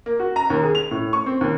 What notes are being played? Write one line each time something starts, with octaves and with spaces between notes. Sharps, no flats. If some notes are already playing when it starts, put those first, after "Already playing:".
A#3
F#4
A#5
D#2
G#4
F7
A2
C#6
C4
D#2